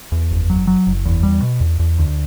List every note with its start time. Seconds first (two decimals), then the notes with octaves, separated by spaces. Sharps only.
0.12 E2
0.31 F#1
0.50 F#3
0.67 F#3
0.87 F#1
1.05 E2
1.23 G3
1.42 B2
1.60 E2
1.79 E2
1.98 D2